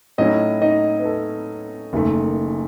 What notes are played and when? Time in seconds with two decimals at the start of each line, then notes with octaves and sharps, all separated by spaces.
0.18 A2 F#3 C#4 D#4 E4 D#5
0.62 D#4 D#5
0.99 B4
1.05 A4
1.93 F#1 F#2 D#3 A3